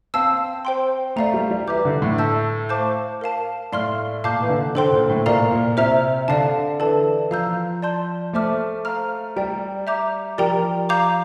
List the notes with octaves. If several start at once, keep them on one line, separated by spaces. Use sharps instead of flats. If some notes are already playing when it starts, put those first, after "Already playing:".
C4 F5 A5 E6
C5 G5 C6
A3 D5 F5 A#5
G3
G3
E3 E5 A#5 D6 G6
D3
A2
E5 A5 E6 G6
C5 F5 A5 D6 G6
A#4 F5 A5
A2 D5 F5 C6 F6
A#2 F5 A5 D6 G6
E3
D3
D3 A4 C5 G5 C6
A#2
A2
A#2 A#4 D5 F5 A#5
A#2
C3 C5 E5 A#5 F6
D3 D5 F5 A5
E3 A4 D5 A5
F3 F5 A#5 E6 G6
D5 A5 C6 G6
A3 C5 E5 A5 D6 F6
C5 F5 A#5 F6
G3 D5 G5 A#5
E5 A#5 D6 G6
F3 G4 A#4 D5 G5 A#5
F5 A#5 D6 G6